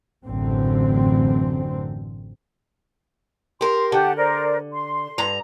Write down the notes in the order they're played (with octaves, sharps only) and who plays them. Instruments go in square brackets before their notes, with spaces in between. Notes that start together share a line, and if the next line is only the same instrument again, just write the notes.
[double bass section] A1 F#2 D3 C4
[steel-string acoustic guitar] G4 A#4 [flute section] C6
[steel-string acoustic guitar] D3 [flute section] G4 F#5 A5
[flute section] A#4 C5 D5
C6
[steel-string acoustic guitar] G2 A#5